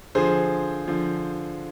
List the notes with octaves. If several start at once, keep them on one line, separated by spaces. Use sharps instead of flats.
D3 F3 G#4 C5
D3 F3